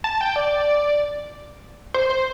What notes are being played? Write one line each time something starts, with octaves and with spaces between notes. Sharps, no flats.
A5
G5
D5
C5
C5